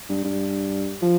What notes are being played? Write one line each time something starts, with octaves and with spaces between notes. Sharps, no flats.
G2
G2
F3